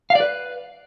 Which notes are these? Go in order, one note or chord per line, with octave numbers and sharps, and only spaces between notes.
F5
D5
B4